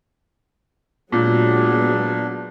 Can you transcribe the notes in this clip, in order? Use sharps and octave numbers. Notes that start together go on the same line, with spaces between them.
A#2 F#3 G#3 B3 D4